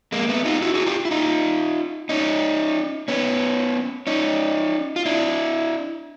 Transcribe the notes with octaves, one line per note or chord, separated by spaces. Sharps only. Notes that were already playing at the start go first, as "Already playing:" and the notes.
G#3 A#3
A3 B3
D#4 F4
E4 F#4
F#4 G#4
F4 G4
E4
D#4 F4
C#4 D#4
B3 C#4
C#4 D#4
F4
D4 E4